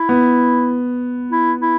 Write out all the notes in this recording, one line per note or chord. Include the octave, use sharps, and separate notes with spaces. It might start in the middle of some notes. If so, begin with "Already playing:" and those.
Already playing: E4
B3
E4
E4